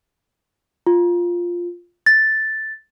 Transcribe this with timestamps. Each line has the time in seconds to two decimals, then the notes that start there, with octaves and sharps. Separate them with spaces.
0.87 F4
2.06 A6